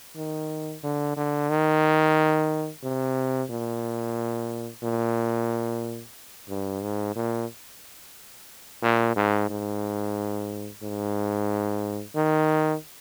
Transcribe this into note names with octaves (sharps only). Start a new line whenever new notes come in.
D#3
D3
D3
D#3
C3
A#2
A#2
G2
G#2
A#2
A#2
G#2
G#2
G#2
D#3